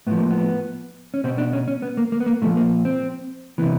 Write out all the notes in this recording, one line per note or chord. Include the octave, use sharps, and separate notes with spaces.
A2 F3 B3
A#3
B3
C#4
B2 C4
D4
C#4
C#4
B3
A#3
A#3
B3
A#3
A#2 F3 A3
A#3
C4
C3 E3 B3